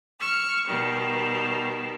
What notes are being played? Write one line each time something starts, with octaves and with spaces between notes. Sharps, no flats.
C#6 E6 F6
B2 D#3 G3